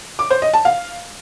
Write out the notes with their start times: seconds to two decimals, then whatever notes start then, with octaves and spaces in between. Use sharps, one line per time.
0.19 D6
0.30 C5
0.42 D#5
0.54 A5
0.65 F5